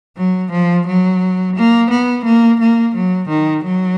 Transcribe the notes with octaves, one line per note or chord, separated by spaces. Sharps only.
F#3
F3
F#3
A#3
B3
A#3
A#3
F#3
D#3
F#3